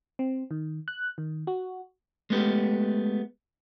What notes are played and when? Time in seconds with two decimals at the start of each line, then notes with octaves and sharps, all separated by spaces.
0.19 C4
0.51 D#3
0.88 F#6
1.18 D#3
1.47 F#4
2.30 G#3 A3 B3 G4